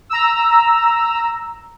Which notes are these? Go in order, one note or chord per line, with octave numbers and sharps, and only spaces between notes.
A#5 E6